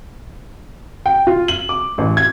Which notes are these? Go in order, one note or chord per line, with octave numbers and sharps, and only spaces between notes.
G5
F4
F#7
D6
A1
G#6